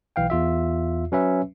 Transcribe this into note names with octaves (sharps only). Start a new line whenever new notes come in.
B1 E3 F5 G5
E2 F4 E5
F#3 C#4 B4 E5